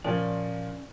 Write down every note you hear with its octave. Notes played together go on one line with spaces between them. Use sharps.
A#2 F3 C#4 D5